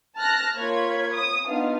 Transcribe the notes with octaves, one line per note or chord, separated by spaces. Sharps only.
A5 F6 F#6 A#6
A#3 F4 C#5 B5 G#6
D#6
B3 D4 D#4 F4 F5